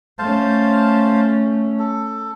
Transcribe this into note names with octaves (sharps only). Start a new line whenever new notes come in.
A3 C#4 C5 F5 A5
A4